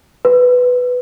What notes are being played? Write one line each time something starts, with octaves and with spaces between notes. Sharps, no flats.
B4